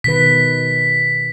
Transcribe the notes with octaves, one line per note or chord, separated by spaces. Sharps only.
B2 D#3 B4 B6